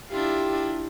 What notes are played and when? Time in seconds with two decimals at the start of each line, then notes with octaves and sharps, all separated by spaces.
0.11 D4 E4 F4 G4